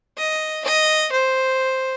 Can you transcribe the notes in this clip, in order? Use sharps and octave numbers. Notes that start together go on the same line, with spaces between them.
D#5
D#5
C5